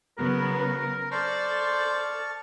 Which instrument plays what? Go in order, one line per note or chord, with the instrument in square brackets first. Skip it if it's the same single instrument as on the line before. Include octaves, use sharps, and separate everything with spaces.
[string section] C#3 F#3 B3 [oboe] A#4 [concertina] B4
[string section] A4 [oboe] C5 [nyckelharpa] D5 [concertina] A5 C#6 F6